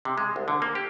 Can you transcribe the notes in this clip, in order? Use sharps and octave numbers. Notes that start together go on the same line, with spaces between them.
C3
G#3
C2
D3
A#3
G4